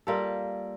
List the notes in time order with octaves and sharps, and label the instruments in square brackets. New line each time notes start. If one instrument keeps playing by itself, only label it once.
[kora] G3 A#3 F4 A4